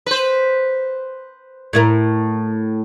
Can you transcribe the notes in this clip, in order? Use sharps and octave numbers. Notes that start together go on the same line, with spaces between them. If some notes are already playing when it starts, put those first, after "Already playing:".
B4 C5
A2 E4 A#4